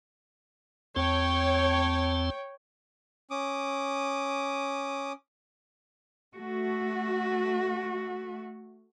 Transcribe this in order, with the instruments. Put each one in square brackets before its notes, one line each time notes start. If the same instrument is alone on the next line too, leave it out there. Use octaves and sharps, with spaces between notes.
[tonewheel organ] E2 C4 A5 [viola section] C#5 G5
[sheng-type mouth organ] C#4 D6 D#6
[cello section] A3 F#4